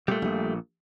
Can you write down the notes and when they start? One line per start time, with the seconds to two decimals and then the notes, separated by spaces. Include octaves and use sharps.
0.08 A#2 G3 A3
0.22 A#1 A#2